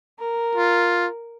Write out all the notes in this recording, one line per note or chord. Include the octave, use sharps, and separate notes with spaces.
A#4
F4